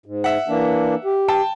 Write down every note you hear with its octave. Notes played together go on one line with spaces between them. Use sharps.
G#2
E5 F#5
E3 A#3 D4
G4
G5 A5